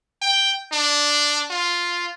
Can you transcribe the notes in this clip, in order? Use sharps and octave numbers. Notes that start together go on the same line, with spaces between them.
G5
D4
F4